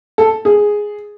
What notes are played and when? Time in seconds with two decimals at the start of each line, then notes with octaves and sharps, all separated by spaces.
0.18 A4
0.45 G#4